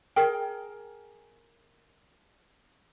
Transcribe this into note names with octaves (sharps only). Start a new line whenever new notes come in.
G#4 A#4 G5